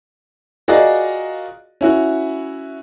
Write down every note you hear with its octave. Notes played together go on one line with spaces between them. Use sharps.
F4 F#4 G#4 A#4 D5 D#5
C#4 E4 F#4